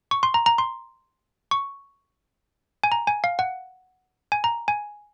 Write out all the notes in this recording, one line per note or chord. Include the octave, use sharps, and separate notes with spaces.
C#6
C6
A#5
A#5
C6
C#6
G#5
A#5
G#5
F5
F#5
G#5
A#5
G#5